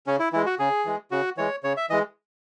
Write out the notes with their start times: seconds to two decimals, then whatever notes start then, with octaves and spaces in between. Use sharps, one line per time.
0.07 C#3 C#4
0.20 E4
0.33 E3 G#3 E4
0.46 F#4
0.59 C#3 G#4
0.85 E3 G#3
1.11 C#3 F#4
1.37 E3 G#3 C#5
1.64 C#3 C#5
1.77 E5
1.90 E3 G#3 D#5